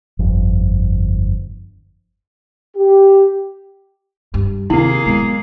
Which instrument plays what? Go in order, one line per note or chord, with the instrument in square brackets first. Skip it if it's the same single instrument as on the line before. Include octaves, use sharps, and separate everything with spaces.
[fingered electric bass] G1 F2
[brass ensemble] G4
[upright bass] G2
[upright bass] D#2 [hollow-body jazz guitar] C3 [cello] A#3 G#4 [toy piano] E4
[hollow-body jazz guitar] B2 [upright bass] F#3 G#3